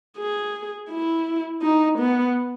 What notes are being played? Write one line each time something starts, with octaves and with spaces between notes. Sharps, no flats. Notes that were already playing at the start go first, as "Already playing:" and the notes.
G#4
E4
D#4
B3